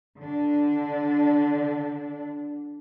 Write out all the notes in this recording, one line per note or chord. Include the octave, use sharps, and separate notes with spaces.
D3 D4